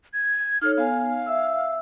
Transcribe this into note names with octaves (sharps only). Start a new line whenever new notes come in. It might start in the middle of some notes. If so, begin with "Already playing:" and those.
G#6
D#4 A4 C#5 F6
B3 F5 G#5
E5 E6